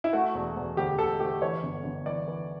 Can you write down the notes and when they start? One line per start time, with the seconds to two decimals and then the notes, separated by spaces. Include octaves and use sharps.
0.04 E4
0.13 A3 F#4
0.34 E1
0.56 E1
0.77 D2 G4
0.98 D2 A4
1.20 A3 G4
1.42 E3 C#5
1.63 G1
1.84 G1
2.06 E3 D5
2.28 E3